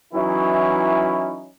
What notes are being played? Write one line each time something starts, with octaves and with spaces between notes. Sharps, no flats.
E3 F#3 C#4 D#4 E4